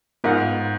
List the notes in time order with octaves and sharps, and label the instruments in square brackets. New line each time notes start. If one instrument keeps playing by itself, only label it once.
[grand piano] G#2 [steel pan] B3 F4 A#4 D#5 F#5